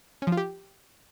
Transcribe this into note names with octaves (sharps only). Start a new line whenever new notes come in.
C#4
F3
F4
G4